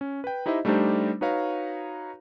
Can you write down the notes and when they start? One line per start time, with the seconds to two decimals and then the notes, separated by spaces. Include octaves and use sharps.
0.01 C#4
0.24 B4 G5
0.46 D#4 E4 G4 C5 D#5 E5
0.65 G3 A3 D4 D#4 G4 C5
1.21 D#4 F#4 B4 C#5 F5 A#5